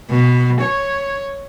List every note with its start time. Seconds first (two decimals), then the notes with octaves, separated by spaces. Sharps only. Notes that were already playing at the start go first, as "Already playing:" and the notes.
0.11 B2
0.62 C#5